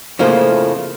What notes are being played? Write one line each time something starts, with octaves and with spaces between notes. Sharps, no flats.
F2 A2 C#3 F3 A3 A#3